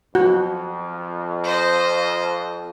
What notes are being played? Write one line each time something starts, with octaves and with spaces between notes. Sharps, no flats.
F2 F#4
C5 D#5